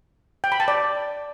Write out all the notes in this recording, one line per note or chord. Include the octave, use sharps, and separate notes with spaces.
G5
B5
A5
D5